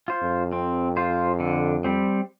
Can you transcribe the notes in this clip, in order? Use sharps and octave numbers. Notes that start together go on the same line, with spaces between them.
F4 C5
F2
C4
F4 C5
D3
G3 C4